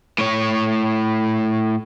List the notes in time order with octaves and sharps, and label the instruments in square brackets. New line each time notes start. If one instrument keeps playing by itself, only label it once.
[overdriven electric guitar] A2 C#5